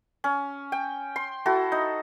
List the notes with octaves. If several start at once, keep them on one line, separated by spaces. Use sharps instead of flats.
C#4
G5
C6
E4 F#4 A4
D#4